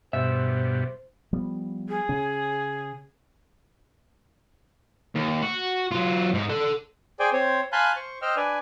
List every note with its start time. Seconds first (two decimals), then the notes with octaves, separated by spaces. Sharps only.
0.13 G2 B2 C5 E5
1.33 F3 G3 B3
1.89 G#4
2.09 C#3 C#4
5.15 D#2
5.42 F#4
5.92 F#3 F4
6.34 G#2 D#4
6.49 A4 F#5
7.20 G#4 C5 D5 G5 G#5
7.33 C4 C5 C#5
7.72 F5 G#5 A5 B5 C6 F#6
7.96 C5 C#6
8.22 C5 D#5 G5 E6 F6
8.36 D4 B4 D5 G#5